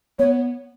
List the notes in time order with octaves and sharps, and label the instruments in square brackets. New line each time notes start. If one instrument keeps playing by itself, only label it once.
[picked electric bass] B3 [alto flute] C#5